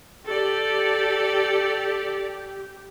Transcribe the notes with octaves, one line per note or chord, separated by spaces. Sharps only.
G4 A4 D5